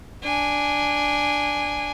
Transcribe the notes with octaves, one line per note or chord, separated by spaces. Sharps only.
D4 G#5